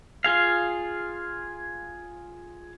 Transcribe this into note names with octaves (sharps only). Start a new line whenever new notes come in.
F4 G#4 F5